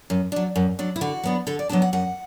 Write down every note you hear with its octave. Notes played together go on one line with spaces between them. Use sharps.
F#2
F#3 D4
F#2
F#3 D4
E4
D3 F#4
F#3 B3 D4
D3 A4
D5
F#3 B3 D4 A5
F#5
F#2 F#5